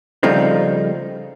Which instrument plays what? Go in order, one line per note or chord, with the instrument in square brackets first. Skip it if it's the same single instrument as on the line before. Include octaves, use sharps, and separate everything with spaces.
[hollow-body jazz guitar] C#3 F3 G3 A3 C4 D#4